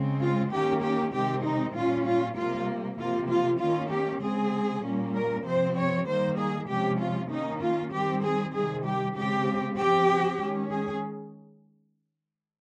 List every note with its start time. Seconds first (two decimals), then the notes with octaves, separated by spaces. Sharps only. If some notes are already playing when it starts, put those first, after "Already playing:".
Already playing: C#3 G#3 C4
0.20 F4
0.51 D#3 A#3 C#4 G4
0.82 G4
1.12 C3 D#3 G#3 C4 G4
1.44 D#4
1.75 A#2 G3 C#4 F4
2.06 F4
2.36 C3 G3 A#3 F4
2.98 C3 F3 A#3 F4
3.28 F4
3.60 D#3 A#3 C#4 F4
3.91 G4
4.22 C#3 G#3 C4 G#4
4.83 A#2 G3 A#3 C#4
5.14 A#4
5.45 C3 F3 C4 C5
5.76 C#5
6.06 D#3 G3 A#3 C5
6.37 G#4
6.68 C3 F3 G#3 C#4 G4
6.99 F4
7.30 D#3 A#3 C#4 D#4
7.61 F4
7.92 D#3 G3 C4 G4
8.23 G#4
8.53 C3 D#3 G3 G#4
8.84 G4
9.15 C#3 G#3 C4 G4
9.77 F3 C4 G4
10.39 D#3 G#3 C#4
10.69 G#4